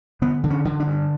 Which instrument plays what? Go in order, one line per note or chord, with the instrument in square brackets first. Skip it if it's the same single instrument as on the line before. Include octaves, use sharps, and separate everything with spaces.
[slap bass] D3 B3
D3
C#4
D3
D4
G2